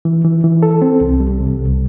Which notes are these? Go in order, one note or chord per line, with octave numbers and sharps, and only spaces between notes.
E3
E3
E3
A4
C4
C2
G3
C3
C2